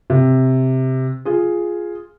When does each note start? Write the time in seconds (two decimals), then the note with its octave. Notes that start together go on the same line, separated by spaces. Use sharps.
0.10 C3
1.25 F4 G#4